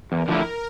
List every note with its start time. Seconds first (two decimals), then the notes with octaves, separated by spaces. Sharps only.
0.12 E2 A#4
0.28 D3 F3 A3 E4